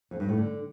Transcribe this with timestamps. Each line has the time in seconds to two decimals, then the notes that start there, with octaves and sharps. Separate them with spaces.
0.11 F2
0.20 G2
0.29 A2
0.38 D3